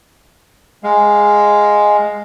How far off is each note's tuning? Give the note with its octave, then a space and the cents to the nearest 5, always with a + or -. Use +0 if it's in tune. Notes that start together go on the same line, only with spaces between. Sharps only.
G#3 +0 F5 +0